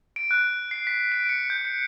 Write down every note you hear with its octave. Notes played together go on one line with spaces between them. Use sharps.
D7
F#6
C7
B6
D7
C#7
G6
C#7